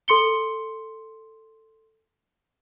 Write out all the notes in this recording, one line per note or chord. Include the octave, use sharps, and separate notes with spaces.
A4 C6 C#7 G7